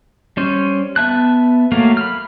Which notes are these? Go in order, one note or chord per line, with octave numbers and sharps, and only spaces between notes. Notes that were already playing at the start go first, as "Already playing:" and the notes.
G3 C#4 C5
B3 E5 A5 F#6
F#3 A3 A#3 F5
B5 F6